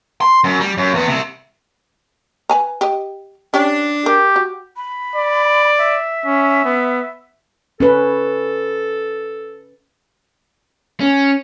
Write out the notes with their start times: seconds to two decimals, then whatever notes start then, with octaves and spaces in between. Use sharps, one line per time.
0.21 C6
0.44 F#2
0.60 G3
0.78 F#2
0.94 E2 B3
1.08 C3 E4
2.49 B4 G#5 A#5
2.81 G4 D#5
3.54 C#4 D4 G4
4.06 G4 A#4
4.36 F#4
4.77 B5
5.15 D5
5.78 E5
6.25 C#4
6.65 B3
7.80 C#4 A4 B4
11.00 C#4